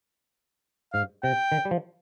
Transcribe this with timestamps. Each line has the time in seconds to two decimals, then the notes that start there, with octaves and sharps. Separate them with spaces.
0.93 G#2 F5
1.23 C3 G5
1.52 D#3
1.65 G3
1.71 F3